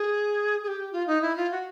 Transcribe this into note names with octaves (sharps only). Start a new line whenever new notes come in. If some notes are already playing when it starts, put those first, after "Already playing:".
Already playing: G#4
G#4
G4
F4
D#4
E4
F4
F#4